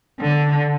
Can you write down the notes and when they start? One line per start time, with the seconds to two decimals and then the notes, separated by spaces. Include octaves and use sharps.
0.20 D3